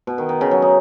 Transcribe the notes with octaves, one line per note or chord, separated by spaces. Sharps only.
B2
D#3
D#3
C#3
F#3
D#4